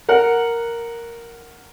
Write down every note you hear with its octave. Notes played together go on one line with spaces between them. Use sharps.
A#4 F#5